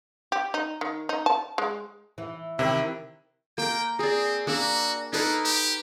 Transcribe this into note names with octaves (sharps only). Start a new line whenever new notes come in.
G4
D#4
D#3
D#4
A5
G#3
E3
C3 D#3 E3 E4
A#3 A#4 G5
C4 G#4 D5
A#3 D4 F#4 E5
A#3 D#4 A4 B4
G4